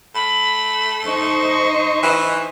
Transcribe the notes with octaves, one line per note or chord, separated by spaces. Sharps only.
A3 B5
D#4 C5 D#5 C#6
E3